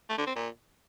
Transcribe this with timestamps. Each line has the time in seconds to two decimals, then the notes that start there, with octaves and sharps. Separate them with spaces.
0.09 A3
0.18 D3
0.27 C4
0.36 A#2